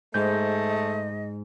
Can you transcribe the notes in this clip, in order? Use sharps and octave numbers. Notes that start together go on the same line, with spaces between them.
G#2 A3 G#4 D#5 G6